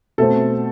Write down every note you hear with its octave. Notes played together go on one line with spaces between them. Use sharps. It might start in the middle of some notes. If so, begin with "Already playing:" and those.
B2 A3 C4 A4